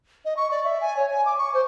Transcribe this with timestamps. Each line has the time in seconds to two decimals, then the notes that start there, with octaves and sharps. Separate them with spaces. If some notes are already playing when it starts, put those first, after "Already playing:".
0.25 D#5
0.37 C#6
0.51 D5
0.64 E5
0.81 G#5
0.97 C#5
1.12 G#5
1.25 D6
1.38 C#6
1.54 C5